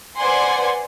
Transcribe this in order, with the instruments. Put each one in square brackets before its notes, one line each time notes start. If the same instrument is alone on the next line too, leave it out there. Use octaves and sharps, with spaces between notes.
[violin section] B4 C5 D5 F#5 G#5 C6